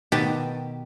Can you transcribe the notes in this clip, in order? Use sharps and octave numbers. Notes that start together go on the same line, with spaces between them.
B2 D#3 G4 B4 G5 A5